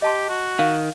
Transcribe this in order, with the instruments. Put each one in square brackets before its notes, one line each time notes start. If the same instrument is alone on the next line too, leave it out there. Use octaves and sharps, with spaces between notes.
[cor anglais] G4 [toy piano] D#5 A5 C6
[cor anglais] F#4
[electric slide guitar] D#3 [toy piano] F5